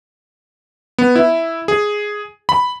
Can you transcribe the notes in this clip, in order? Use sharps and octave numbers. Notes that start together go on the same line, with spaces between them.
B3
E4
G#4
B5